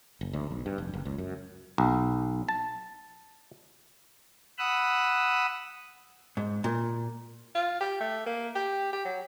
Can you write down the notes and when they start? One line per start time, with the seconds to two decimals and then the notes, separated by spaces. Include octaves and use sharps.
0.21 F#1
0.33 D2
0.51 B1
0.66 G2
0.78 F1
0.94 F#1
1.05 C#2
1.18 F#2
1.78 B1
2.49 A5
4.58 F#5 B5 D#6 E6 F#6
6.37 G#2
6.64 A#2
7.55 F4
7.80 G4
8.00 A3
8.26 A#3
8.55 G4
8.93 G4
9.05 F#3